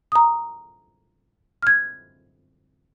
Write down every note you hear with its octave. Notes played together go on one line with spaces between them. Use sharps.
A#5 D#6
F6 G#6